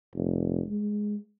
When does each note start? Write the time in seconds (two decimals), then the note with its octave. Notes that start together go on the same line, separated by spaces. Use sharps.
0.14 F1
0.68 G#3